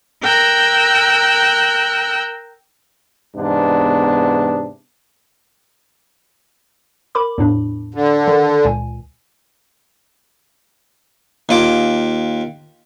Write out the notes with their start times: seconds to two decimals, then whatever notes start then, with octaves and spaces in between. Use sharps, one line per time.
0.23 A#4 G5 E6 F#6
3.36 E2 G#2 C3 B3 D4
7.15 A#4 B5 D6
7.38 E2 A2 D4
7.94 D3
8.27 D#3
8.65 C#2 A#2 G#5
11.49 D#2 F4 D6